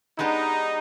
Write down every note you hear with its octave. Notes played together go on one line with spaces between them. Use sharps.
G#3 B3 D4 D#4 G4